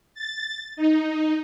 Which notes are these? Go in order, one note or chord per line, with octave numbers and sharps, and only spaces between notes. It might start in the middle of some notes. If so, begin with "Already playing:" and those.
A6
D#4